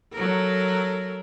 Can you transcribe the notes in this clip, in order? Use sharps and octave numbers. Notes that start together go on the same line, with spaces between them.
F#3 A4 A#4